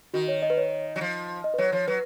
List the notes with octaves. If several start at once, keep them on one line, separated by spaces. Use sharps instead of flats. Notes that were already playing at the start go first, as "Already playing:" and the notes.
D#3 F#4
C#5
D#5
B4
C#5
F#3
F3
D#5
B4
F#3 C#5
F3 C#5
F#3 B4